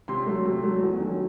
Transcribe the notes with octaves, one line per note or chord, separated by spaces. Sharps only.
C3 C6
F#3 A3
C3
F#3 A3
E2
D#3 F#3 A3